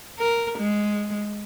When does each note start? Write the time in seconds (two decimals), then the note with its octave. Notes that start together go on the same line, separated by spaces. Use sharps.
0.19 A#4
0.58 G#3